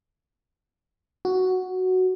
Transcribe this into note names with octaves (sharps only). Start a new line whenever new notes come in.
F#4